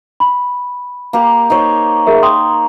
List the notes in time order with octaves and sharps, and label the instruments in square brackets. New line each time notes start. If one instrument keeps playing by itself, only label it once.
[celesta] B5
[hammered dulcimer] A#3 G4
D#4 C5 C#5
[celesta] G#4 A#4 E5
G5 C6 D#6